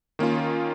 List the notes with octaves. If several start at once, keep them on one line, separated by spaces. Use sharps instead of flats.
D#3 A#3 C#4 F4